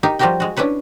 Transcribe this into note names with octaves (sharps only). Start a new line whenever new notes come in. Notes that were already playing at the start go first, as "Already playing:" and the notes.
D#4 G4 A#4
F3 G3 F#4 G4 A#4 G5
G#3 F#4
C#4 D4 E4 B4 C#5